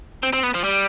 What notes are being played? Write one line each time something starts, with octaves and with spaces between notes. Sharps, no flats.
C4
C4
B3
F3
G3